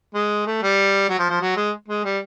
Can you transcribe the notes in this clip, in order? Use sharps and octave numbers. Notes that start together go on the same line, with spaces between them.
G#3
A3
G3
F#3
F3
F3
F#3
G#3
G#3
G3